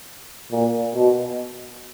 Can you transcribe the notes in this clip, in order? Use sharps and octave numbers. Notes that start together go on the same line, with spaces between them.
A#2
B2